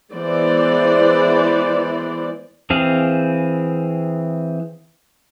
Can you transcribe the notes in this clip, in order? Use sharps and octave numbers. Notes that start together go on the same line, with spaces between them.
E3 G#3 B3 C5 D5
E3 C4 G#4 F5